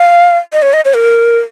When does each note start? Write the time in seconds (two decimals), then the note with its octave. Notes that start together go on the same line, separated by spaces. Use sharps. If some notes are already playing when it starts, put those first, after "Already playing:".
Already playing: F5
0.53 D#5
0.62 C#5
0.73 D#5
0.85 C#5
0.95 A#4